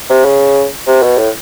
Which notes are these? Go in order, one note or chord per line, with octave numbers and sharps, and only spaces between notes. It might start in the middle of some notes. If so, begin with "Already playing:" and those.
C3
C#3
C3
B2
A2